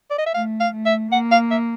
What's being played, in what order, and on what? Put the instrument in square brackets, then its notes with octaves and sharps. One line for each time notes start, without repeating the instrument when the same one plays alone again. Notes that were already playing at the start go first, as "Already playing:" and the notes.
[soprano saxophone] D5
D#5
E5
[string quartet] A3 [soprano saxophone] F5
[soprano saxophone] F5
[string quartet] A3
[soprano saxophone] E5
[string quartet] A#3 [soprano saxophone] F#5
[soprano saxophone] F5
E5